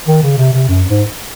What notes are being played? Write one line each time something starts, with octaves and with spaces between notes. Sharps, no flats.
D#3
C#3
C3
C3
F#2
G#2